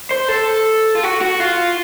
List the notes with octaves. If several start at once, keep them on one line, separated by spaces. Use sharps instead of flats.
C5
A4
F4
F#4
F#4
F4